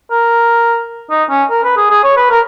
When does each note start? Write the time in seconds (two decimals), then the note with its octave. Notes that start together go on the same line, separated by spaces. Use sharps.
0.11 A#4
1.10 D#4
1.29 C#4
1.50 A#4
1.64 B4
1.77 G#4
1.90 G#4
2.04 C#5
2.16 B4
2.30 A#4